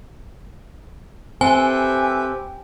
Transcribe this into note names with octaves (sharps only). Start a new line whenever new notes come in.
C4 G4 A4 B4 E5 G#5